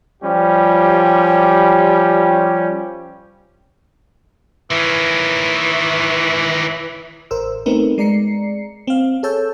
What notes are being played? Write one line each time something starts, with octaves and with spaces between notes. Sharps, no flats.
F3 G3 C#4 G4
D#3 E3 C#4
A1 A#4 C5 E6
A3 B3 C4 D#4 A#4 B4
G#3 D5 A#5 C7 C#7
C4 F5
G#4 A4 C#5 A5 E6 G6